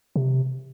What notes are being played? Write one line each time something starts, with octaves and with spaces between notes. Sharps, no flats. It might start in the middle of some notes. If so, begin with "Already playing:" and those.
C3